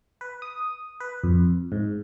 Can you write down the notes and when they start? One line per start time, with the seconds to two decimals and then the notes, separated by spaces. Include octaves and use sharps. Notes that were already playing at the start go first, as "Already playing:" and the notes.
0.21 B4
0.42 D#6
1.00 B4
1.24 F2
1.72 G#2